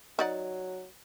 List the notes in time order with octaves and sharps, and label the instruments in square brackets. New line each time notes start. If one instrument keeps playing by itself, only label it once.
[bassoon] F#3 [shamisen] D#4 D5 F#5